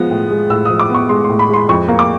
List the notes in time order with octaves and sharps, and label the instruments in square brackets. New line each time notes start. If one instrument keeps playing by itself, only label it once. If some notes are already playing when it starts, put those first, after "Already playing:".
Already playing: [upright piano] F3 G#3 B3
A2
G#3
A2 E6
F3 D#6
D6
B3 C#6
G#3 C6
A2 C6
B5
G#3 C6
F2 C#6
A#3
D6